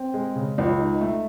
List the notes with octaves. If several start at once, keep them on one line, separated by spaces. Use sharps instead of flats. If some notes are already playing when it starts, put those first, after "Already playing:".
Already playing: C4
G#3
C#3
C#2
D#4
A3